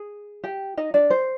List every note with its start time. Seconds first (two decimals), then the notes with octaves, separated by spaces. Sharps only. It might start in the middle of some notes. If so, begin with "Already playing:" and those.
Already playing: G#4
0.44 G4 G5
0.77 D#4 D#5
0.94 D4 D5
1.10 C5